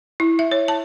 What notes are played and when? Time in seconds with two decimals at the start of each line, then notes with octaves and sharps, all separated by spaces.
0.20 E4
0.39 E5
0.52 C#5
0.68 A5